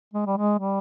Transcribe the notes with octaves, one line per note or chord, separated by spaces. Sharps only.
G#3
G3
G#3
G3